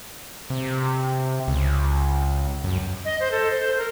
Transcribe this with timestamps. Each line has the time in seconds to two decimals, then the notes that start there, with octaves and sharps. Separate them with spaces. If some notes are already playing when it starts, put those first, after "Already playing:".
0.50 C3
1.48 C#2
2.64 F#2
3.05 D#5
3.20 C5
3.31 A4
3.51 C5
3.77 A#4